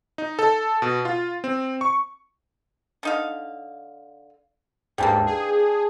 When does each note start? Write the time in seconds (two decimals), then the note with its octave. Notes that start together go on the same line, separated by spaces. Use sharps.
0.18 D#4
0.39 A4
0.82 B2
1.05 F4
1.44 C4
1.81 C#6
3.03 D3 D#4 F5
4.98 D#2 G#2 E3 G3 A#3 D4 G5 A5
5.26 G#4